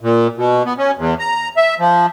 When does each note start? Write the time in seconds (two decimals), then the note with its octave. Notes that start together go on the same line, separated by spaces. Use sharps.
0.01 A#2
0.37 B2
0.66 B3
0.78 C#4
0.97 E2
1.19 A#5
1.57 E5
1.79 F3